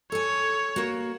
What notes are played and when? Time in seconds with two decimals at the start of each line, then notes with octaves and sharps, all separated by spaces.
0.12 A4 C#5 G#5
0.76 A#3 F#4